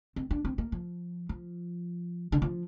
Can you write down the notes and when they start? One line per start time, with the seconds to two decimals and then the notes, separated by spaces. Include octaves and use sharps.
0.16 C4
0.31 D4
0.45 C4
0.58 A#3
0.72 F3
1.29 F3
2.32 D3
2.42 F3